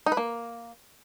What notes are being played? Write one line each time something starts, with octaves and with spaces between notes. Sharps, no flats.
D#4
B4
A#3